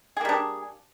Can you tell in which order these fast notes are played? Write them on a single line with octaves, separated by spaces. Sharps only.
G#4 A#3 G3 D4